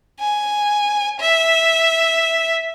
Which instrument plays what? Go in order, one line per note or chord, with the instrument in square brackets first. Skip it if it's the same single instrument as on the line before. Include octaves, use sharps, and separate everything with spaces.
[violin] G#5
E5